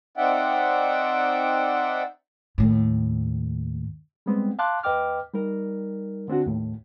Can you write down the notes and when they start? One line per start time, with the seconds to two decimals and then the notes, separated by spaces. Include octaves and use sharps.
0.17 C4 D#4 D5 E5 F#5 G5
2.58 D#2 A2
4.26 G3 G#3 B3 C4
4.59 F5 A5 C6 D6 F#6
4.83 D#2 B4 D#5 G5 D6 F6
5.34 G3 D#4 A#4
6.28 D3 C4 D4 F#4
6.47 D#2 A2